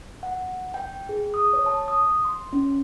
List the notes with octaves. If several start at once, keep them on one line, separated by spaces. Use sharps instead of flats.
F#5
G5
G#4
D#6
C#5
A5
D#6
C6
C#4